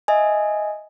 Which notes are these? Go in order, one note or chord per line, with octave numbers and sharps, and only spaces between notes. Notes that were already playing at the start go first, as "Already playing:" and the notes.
D#5 E5 G#5